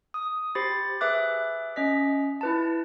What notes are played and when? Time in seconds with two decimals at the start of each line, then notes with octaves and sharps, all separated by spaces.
0.14 D#6
0.55 G4 C5 B5 A6 A#6 C7
1.01 G#4 B4 E5 D6 F#6
1.76 C#4 D#5 B6
2.41 E4 B4 A5